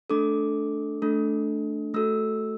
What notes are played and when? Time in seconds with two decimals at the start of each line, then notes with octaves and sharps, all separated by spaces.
0.10 A3 D4 A4 D6
1.02 A3 D4 A4
1.94 A3 F#4 A4 E6